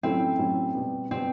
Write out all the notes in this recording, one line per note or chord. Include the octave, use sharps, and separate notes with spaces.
A2 F#3 A3 C4 C#4 E4
A2 F#3 A3 C#4 E4
B2 G3 B3
B2 G3 B3 C4